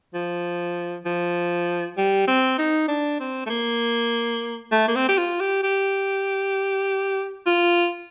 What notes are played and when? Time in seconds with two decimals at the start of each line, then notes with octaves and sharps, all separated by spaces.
0.14 F3
1.05 F3
1.98 G3
2.28 C4
2.59 D#4
2.88 D4
3.20 C4
3.46 A3
3.50 A#3
4.72 A3
4.88 A#3
4.96 C4
5.09 G4
5.18 F4
5.40 G4
5.63 G4
7.46 F4